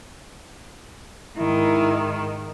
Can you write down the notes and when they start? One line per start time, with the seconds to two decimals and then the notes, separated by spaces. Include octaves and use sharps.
1.38 G#2 D#3 E4